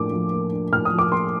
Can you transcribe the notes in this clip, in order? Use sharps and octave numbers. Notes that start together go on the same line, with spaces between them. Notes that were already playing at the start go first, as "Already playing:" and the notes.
Already playing: A2 F3 A#3 D4 D6
F3
A#3
D4
A2 F6
D#6
F3
D6
A#3 C6